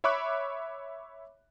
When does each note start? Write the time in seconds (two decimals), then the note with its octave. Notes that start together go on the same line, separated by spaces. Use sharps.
0.04 C#5 E5 B5 C#6 D6 F#6